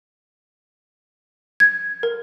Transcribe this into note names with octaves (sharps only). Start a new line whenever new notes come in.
G#6
A#4